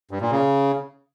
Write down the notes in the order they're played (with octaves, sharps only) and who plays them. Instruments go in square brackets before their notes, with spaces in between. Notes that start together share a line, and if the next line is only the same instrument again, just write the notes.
[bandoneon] G2
A#2
C#3